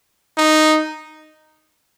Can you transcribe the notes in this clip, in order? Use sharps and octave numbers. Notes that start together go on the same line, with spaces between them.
D#4